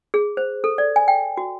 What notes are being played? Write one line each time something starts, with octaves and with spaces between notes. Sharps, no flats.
G#4
C5
A4
D5
G#5
G5
F#4